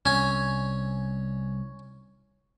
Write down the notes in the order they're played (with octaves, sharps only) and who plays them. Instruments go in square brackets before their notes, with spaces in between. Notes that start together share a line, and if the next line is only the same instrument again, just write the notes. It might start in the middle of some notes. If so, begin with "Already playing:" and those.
[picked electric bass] C2 [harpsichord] C#4 G#5